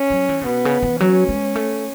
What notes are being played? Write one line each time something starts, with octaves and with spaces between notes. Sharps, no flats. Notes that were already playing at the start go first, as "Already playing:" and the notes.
Already playing: C#4
F#3
E3
C#3
B2 B3
C#3
E3
F#3 C#4
G#3
A3